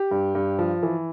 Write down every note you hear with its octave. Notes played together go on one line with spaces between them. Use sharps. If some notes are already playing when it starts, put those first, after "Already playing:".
Already playing: G4
G2
G2
F3
E3